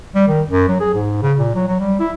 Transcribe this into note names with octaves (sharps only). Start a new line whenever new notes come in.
G3
D#3
F#2
F#3
G#4
G#2
C#3
A#2
F#3
F#3
G3
E4